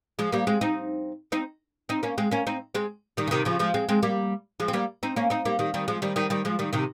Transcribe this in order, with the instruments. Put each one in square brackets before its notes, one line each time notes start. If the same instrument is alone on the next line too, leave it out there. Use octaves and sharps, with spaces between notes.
[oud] F3 G#3
G3 A#3
G#3 C4
C4 D#4
C4 D#4
C4 D#4
A#3 C#4
G#3 C4
A#3 C#4
C4 D#4
G#3 C4
D#3 G3
C#3
C3 D#3
C#3 F3
F3 G#3
G#3 C4
G#3 C4
G3 A#3
F3 G#3
C4
G3 A#3
C4 D#4
A#3 C#4
C4 D#4
G3 A#3
D#3 G3
D#3 G3
F3 G#3
D#3 G3
D#3 G3
D#3 G3
F3 G#3
D#3 G3
C3 D#3